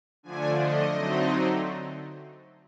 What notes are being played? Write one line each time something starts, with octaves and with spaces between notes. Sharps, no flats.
D3 F3 A3 D4 G#5
D#5
D3 F#3 A3 C4 D#4